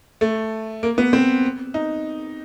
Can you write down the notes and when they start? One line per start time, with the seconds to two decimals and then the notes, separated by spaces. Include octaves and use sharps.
0.21 A3
0.83 A#3
0.98 B3
1.13 C4
1.74 D#4